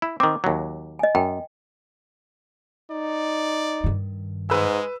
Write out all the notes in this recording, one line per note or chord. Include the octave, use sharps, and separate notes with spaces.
E4
D#3 C4 D6
D#2 F#3
D#5 G#5
F#2 G5
D#4 D5
G2 D#3
G#2 G#3 B4 E6